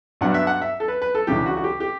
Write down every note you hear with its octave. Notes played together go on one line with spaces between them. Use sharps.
G2 F#3 B3 D4 F#5
E5
F#5
E5
A4
B4
B4
A4
C#2 C#3 E3 G3 D4 G4
F#4
F#4
G4
G4